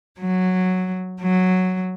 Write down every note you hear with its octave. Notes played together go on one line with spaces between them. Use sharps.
F#3
F#3